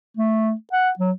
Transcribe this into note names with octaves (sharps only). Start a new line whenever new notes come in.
A3
F#5
F#3